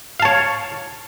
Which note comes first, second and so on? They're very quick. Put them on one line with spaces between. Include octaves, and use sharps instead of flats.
F5 A5 C#5